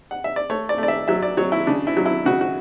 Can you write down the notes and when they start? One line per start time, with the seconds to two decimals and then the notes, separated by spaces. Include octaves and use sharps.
0.11 F#5
0.24 E5
0.36 D5
0.50 A3 C#5
0.69 D5
0.78 A3
0.83 D5
0.88 E5
1.08 F#3 E5
1.23 D5
1.37 F#3 C#5
1.52 E4
1.67 C#3 D4
1.87 E4
1.97 F#3
2.06 E4
2.25 C#3 F#4
2.41 F#4